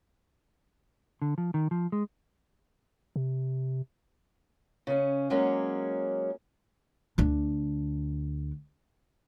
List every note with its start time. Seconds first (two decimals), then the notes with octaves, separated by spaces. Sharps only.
1.22 D3
1.38 F3
1.54 D#3
1.71 F3
1.92 G#3
3.16 C3
4.87 C#3 C#4
5.30 F#3 G#3 A#3 C#4
7.18 D2 D4